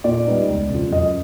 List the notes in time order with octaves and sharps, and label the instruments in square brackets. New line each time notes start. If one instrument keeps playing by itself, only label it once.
[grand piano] A#2 D5
G3 B3 D#4
C#2
C#3 F3
F#2 D#5